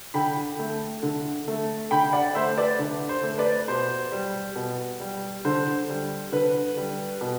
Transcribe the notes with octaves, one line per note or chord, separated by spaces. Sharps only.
D3 G5 B5
A3
D3
A3
D3 G5 B5
D5 F#5
A3 C5 E5
B4 D5
D3
C5
A3
B4 D5
B2 C5
G3
B2
G3
D3 C5
G3
D3 B4
G3
B2